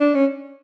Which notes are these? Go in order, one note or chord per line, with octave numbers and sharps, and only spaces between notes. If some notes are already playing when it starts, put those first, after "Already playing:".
D4
C#4